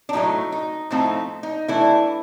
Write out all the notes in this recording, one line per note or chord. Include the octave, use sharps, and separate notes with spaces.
D4
A2 F#3 A3 D#4
D#4
A2 F3 A3 C4 D#4
D#4
E3 A3 D4 E4